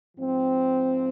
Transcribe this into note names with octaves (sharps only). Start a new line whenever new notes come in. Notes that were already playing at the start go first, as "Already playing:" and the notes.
G#2 F3 C4